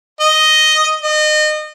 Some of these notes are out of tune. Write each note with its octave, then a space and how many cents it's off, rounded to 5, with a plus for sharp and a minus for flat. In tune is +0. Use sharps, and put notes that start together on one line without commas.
D#5 +0
D#5 -30